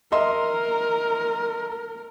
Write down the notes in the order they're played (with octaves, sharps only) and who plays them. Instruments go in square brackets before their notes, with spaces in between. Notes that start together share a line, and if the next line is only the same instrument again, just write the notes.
[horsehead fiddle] A#4 [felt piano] D#5 E5 C6